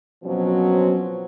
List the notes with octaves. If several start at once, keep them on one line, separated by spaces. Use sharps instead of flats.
B2 F3 F#3 C4 C#4